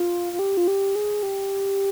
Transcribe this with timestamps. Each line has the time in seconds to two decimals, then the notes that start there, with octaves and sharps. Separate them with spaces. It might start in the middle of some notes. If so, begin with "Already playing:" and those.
Already playing: F4
0.33 F4
0.39 G4
0.57 F4
0.68 G4
0.95 G#4
1.23 G4